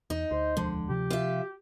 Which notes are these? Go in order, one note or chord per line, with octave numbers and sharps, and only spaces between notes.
E2 D#4
D2 C5
E1 D3 F3 G#3
C3 F3 G4
F4 E5